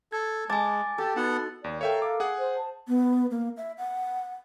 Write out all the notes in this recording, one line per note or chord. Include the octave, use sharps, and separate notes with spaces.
A4 G#6
G#3 G#5 A5 D6
G4 A4
B3 D#4 F#4 F#5
D#2 D5
A4 A#4 C#5 E5 F5 G5
D6
G#4 F#5
C5
A5
B3
A#3
E5
F#5